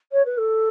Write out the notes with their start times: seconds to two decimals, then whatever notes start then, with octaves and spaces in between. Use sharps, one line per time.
0.12 C#5
0.25 B4
0.37 A4